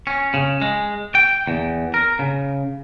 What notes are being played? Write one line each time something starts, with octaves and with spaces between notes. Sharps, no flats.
C#4
C#3
G#3
G5
E2
A#4
C#3